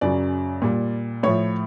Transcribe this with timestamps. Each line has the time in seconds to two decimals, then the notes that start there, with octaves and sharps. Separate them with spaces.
0.01 F#2 C#3 F#3 D5
0.62 A#2 G3
1.23 A2 F3 C#5